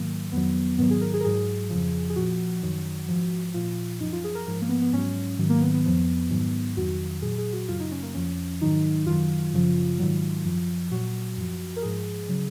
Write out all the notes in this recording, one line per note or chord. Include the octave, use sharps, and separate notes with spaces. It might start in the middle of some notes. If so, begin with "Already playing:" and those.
Already playing: G#2 D#3 F#3 A#3
F2 D#3 F#3 B3
G#2 D#3 F#3 B3
G#4
A#4
G#4
A#4
G#2 F#3 G#4
F2 C#3 F3
G#4
A#2 F3 F#4
F#2 D#3 F#3
G#2 F3
A#2 F3 F4
F#2 F3 D#4
F4
G#4
A#4
G#2 F3 A#4
A#3
B3
B3
G#2 F#3 C#4
G#2 D#3 F#3
A#3
B3
B3
F2 F3 B3
G#2 D#3 F#3
F2 D#3 F#3 F#4
A#2 F#3 G#4
G#4
F#4
F#2 C#3 F#3 F4
D#4
C#4
A#3
F2 F3 C#4
G#2 D#3 F#3 D#4
F#2 D#3 F#3 F4
F#2 C#3 F3
G#2 D#3 F#3
F#2 F3
A#2 F#3 F#4
F#2 F3
A#4
G#2 F3 G#4
C#3 F#3